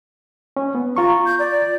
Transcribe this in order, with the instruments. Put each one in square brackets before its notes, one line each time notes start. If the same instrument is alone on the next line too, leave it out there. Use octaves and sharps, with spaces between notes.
[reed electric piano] C#4
B3
[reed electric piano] F4 C#6 [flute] A#5
[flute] G6
D5